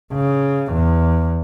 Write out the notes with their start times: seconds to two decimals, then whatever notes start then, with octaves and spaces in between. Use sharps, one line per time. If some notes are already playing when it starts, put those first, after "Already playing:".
0.14 C#3
0.74 E2